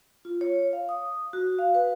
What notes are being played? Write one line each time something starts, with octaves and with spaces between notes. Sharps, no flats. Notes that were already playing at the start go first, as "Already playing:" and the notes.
F4
C#5
F5
D#6
F#4
F5
B4